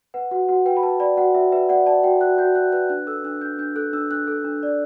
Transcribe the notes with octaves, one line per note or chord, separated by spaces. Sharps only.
B4 F#5
F#4 F#5
F#4 F#5
B4 G5
B5
B4 A5
D5 B5
F#4 F#5
F#4 E5
B4 E5
D5 F#5
D5 A5
F#4 G5
F#4 F#6
F#4 G6
F#4 F#6
B4 F#6
D4 F#6
A4 E6
D4 F#6
D4 G6
D4 G6
A4 F#6
D4 E6
D4 F#6
A4
D4
D5